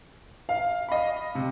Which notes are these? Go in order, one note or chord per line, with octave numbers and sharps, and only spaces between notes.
F5
D#5 B5
C3